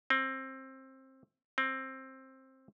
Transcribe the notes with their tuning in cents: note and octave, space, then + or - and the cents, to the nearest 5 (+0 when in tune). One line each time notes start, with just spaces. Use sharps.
C4 +20
C4 +15